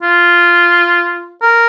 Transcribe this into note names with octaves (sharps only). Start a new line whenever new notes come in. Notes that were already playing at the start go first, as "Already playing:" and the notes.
F4
A#4